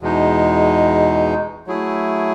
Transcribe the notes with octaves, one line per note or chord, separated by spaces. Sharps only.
E2 B2 G#3 D#4
F#3 A3 E4 G#4